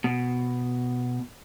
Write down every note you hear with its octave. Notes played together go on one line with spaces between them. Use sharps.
B2